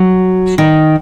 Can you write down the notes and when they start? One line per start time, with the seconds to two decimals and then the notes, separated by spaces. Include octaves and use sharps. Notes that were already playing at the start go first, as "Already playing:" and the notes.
Already playing: F#3
0.58 D#3